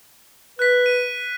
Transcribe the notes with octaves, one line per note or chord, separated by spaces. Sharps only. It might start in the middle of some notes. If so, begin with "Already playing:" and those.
B4 F#6 B6
D#7